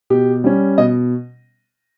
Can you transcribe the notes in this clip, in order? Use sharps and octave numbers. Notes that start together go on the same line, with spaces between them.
B2 G4
G3 C#4
B2 D#5